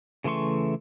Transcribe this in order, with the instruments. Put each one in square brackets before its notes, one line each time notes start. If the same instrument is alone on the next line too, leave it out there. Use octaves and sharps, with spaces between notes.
[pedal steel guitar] C#3 E3 A3 C6 C#6